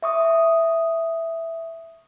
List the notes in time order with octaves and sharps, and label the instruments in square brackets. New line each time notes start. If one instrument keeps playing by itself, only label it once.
[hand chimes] E5 C#6 D#6